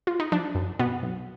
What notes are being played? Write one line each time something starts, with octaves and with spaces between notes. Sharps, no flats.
F4
D#4
F3 D4
F#2
B2 B3
B1